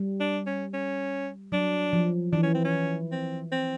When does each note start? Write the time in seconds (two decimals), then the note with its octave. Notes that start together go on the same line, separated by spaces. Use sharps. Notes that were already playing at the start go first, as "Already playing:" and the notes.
Already playing: G3
0.20 D4
0.46 C#4
0.73 C#4
1.52 F#3 D4
1.93 F3
2.32 E3 D4
2.43 C#4
2.54 C4
2.64 C#4
3.12 C4
3.51 C4